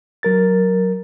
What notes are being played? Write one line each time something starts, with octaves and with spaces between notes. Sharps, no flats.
F#3 A#4 A6